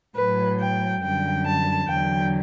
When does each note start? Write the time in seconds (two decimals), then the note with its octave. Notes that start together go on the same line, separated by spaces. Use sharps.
0.16 A2 F#3 B4
0.59 G5
1.02 F#2 D3 G3 G5
1.46 A5
1.88 E2 D3 F#3 G5